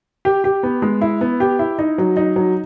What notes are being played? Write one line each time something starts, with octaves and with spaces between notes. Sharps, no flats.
G4
G4
B3
G#3
E4
B3
G4
E4
D#4
F#3
D#4
F#3